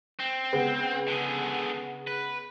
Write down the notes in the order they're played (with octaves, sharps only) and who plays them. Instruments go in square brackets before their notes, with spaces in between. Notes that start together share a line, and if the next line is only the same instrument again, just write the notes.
[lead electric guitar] C4
[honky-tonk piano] C#3 G#3 B3
[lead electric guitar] D3 G#4
B4